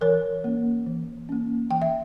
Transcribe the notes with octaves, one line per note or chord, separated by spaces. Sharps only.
E3 A#4 C#5
A#3 C#4
E3
A#3 C#4
E3 G5
E5